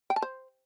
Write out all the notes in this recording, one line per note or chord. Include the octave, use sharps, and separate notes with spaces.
G5
A5
C5